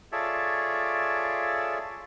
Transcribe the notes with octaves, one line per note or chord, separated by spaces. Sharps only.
F4 G#4 A4 C#5 D5 E5